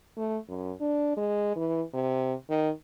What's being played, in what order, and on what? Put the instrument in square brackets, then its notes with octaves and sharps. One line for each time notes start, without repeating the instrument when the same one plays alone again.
[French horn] A3
F#2
D4
G#3
E3
C3
D#3